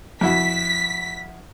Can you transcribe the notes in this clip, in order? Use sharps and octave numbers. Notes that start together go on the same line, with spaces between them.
F2 E4 F#4 B6